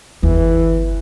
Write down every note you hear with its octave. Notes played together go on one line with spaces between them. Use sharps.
G1 E2 E3